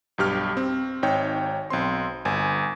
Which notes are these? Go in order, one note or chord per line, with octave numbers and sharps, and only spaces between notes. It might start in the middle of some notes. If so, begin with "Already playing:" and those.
B1 G2 G4 F6
C4
G#1 D#4 C#5 G5
B1 C4 C6
G1 G#5